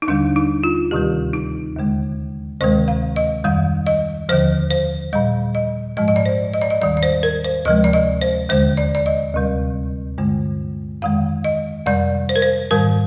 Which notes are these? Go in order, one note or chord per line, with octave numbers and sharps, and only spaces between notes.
D#4
D#2 D3 G3 D4
D#4
F4
D2 C3 D#3 G3 G4
D#4
D#2 D3 G#3
D2 C3 D#3 G#3 C5
F5
D#5
F2 D#3 G3 F5
D#5
D#2 D3 F3 C5
C5
A#2 G3 D#5
D#5
G#2 F3 G#3 D#5
D#5
D5
C5
D#5
D5
D#5
D#2 D#3 G3 D5
D5
C5
A#4
C5
D2 C3 F3 G#3 D#5
D5
D#5
C5
D#2 D3 G#3 C5
D5
D5
D#5
D2 C3 G3
G2 D3 G#3
F2 D#3 G#3 F5
D#5
F2 C3 G3 D5
C5
A#4
C5
G#2 D#3 G3 A#4